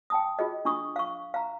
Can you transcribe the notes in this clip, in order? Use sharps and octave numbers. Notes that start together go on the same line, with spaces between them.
G5 A5 D#6
F4 G#4 D#5
D4 F4 C#6 D#6
F5 C#6
F5 A#5